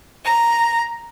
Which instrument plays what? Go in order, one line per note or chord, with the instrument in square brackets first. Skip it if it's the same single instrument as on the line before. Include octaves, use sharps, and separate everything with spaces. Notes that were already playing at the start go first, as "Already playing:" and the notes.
[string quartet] A#5